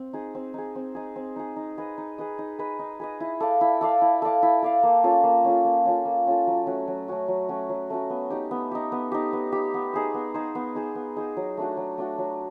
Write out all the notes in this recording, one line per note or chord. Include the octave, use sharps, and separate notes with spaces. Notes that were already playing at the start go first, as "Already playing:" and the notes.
Already playing: C4
D#4 G#4
C4
D#4 G#4
C4
D#4 G#4
C4
D#4 G#4
D#4
G#4 B4 D#5
D#4
G#4 B4 D#5
D#4
G#4 B4 D#5
D#4
G#4 B4 D#5
E4
A4 D5 F5
E4
A4 D5 F5
E4
A4 D5 F5
E4
A4 D5 F5
A#3
C#4 F4 A4
A#3
C#4 F4 A4
A#3
C#4 F4 A4
A#3
C#4 F4 A4
F#3
A3 C#4 F#4
F#3
A3 C#4 F#4
F#3
A3 C#4 F#4
F#3
A3 C#4 F#4
B3
D#4 G4
B3
D#4 G4
B3
D#4 G4
B3
D#4 G4
B3
D#4 G#4 C5
B3
D#4 G#4 C5
B3
D#4 G#4 C5
B3
D#4 G#4 C5
F#3
A3 D4 F#4
F#3
A3 D4 F#4
F#3